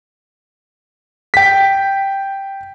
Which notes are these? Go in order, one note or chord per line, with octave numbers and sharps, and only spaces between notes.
G5 B6